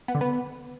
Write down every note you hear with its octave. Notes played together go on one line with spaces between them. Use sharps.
B3
D3
B3